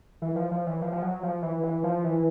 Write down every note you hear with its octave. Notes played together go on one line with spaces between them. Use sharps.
E3
F3
F3
E3
F3
F3
F#3
F3
E3
E3
F3
E3